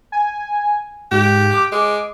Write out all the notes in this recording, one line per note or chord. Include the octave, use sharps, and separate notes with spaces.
G#5
G#2 G4
D6
G#3